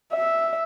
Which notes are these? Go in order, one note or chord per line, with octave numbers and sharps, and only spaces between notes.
E5